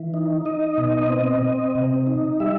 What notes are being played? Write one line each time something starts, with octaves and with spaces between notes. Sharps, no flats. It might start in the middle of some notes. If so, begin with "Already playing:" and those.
Already playing: E3
D#4
D#4 D#5
B2
C4
C4
C3
D#4
G3 E5